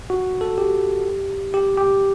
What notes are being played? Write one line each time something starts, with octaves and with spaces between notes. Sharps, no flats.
F#4
A4
G4
G4
G4